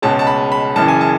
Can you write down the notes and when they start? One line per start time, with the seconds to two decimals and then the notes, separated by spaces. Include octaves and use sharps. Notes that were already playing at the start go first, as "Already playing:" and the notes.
0.02 C#2 B2 G#3 C#4 A5
0.19 A5
0.27 B5
0.52 B5
0.76 F#1 F#2 C#3 E3 A5
0.88 G#5
1.01 A5